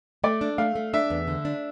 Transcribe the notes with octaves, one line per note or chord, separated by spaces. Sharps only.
A3 D5
D4
A3 F5
A3
D4 E5
E2
D3
D4